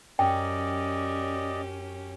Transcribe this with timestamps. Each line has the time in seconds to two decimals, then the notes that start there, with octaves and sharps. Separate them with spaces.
0.19 F#2 C#4 G4 D5 D#5 G5